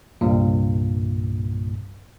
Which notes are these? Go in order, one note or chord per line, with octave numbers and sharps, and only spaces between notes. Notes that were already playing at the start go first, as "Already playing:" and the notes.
C2 G2 A#2